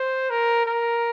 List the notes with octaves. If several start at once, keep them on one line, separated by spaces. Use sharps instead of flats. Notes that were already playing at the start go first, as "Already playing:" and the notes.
Already playing: C5
A#4
A#4